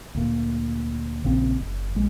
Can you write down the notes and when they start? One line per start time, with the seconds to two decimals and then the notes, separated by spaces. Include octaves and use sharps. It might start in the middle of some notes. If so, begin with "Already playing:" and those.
0.15 D2 A#2
1.24 A#1 A#2 C#3 C4
1.60 F#1
1.95 A#1 G#3